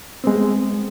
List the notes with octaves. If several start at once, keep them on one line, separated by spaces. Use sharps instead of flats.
G#3 B3 C4